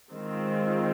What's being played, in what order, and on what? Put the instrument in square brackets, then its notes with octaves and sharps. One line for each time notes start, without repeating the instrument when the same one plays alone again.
[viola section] D#3 G#3 C4 F4